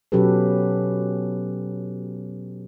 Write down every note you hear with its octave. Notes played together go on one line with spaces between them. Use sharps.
B2 F#3 C#4 G4 A4 B4